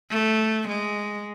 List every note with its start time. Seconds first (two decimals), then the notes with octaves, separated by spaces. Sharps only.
0.11 A3
0.68 G#3